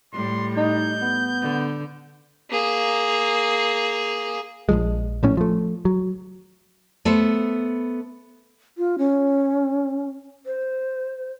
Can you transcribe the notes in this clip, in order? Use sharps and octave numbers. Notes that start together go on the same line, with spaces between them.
A2 G3 C6
D#4 G6
B3
D3
A#3 G#4
A#1 F2 F3 G#3
A#1 A2 C#4
F3 A3
F#3
A3 B3 A4 C5
F4
C#4
C5